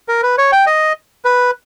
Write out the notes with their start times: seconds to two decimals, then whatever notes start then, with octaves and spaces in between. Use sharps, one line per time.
0.08 A#4
0.23 B4
0.38 C#5
0.52 G5
0.66 D#5
1.25 B4